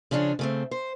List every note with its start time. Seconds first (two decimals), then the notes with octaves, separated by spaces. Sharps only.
0.11 C#3 F3 C#4 D4 G#4
0.39 C#3 A3 C4
0.71 C5